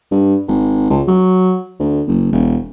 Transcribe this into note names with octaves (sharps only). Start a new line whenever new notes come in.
G2
G#1
C#2
F#3
D2
F#1
E1